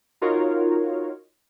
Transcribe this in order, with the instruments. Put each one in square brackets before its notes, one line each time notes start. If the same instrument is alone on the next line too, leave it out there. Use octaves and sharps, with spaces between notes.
[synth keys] D#4 F4 F#4 A#4 C#5